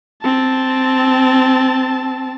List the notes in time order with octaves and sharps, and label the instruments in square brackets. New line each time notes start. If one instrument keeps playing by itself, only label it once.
[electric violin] C4 A5